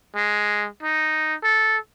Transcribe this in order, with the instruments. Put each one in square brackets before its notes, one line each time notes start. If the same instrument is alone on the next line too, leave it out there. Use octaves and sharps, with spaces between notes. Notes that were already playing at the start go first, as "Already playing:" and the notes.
[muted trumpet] G#3
D#4
A4